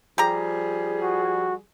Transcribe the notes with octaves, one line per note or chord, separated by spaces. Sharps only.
F3 G3 G4 G#4 A#5
F#4